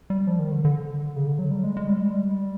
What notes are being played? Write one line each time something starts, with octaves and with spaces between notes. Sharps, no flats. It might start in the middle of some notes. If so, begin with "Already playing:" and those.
G3
F3
D#3
D3
D3
C#3
D3
F#3
G3
G#3
G#3
G3
G#3
G3